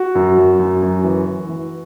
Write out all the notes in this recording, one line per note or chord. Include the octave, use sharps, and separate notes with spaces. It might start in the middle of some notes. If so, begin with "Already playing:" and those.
Already playing: F#4
F#2
F#2
F#2
F#2
E3
E3
E3